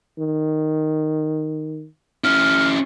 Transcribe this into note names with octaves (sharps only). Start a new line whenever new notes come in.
D#3
C#4 E4 F6